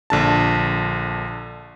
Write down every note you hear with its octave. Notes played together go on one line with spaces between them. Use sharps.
A#1 D3 A5